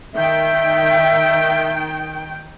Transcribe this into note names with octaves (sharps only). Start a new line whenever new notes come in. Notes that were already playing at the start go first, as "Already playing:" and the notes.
D#3 E5 G5